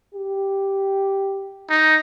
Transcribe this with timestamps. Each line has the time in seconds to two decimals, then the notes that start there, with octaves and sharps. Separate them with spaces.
0.15 G4
1.70 D#4